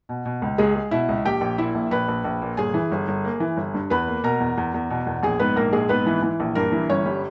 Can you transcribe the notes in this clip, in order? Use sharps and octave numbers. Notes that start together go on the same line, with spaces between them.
B2
B2
C#2
C#2 G#3 G#4
G#3
B2 E4 E5
C#2
A#1 G4 G5
A#1
A#2 E4 E5
A#1
A#1 B4 B5
A#1
A#1
A#2
G1 G#4 G#5
E3
G1
G1
A#3
E3
G1
G2
E2 B4 B5
A#3
B2 A#4 A#5
E2
E2
E2
B2
E2
A#1 G#4 G#5
G#2 B3 B4
A#1 A#3 A#4
A#1 G#3 G#4
G#2 B3 B4
E3
E3
A#1
G2 A#3 A#4
E3
G1 C#4 C#5
G3